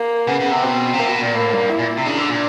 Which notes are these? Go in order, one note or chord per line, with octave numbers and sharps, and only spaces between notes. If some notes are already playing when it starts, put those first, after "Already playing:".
Already playing: A#3
C#3 B3
C#3
C3
B2 C4
C3
A#3
B2
A#2
A2 A#3
G2
E4
A#2
C3
C#3 D4
D3
A#2